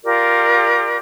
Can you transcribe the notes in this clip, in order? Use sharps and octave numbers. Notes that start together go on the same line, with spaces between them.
F4 G4 A#4 D5